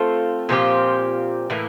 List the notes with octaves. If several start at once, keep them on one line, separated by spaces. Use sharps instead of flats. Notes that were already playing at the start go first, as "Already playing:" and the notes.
Already playing: A3 C4 F4 A4
A#2 F3 C4 G4
A2 E3 A#3